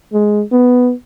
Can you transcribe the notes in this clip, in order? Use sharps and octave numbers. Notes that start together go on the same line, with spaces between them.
G#3
B3